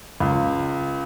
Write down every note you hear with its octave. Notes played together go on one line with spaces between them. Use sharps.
C#2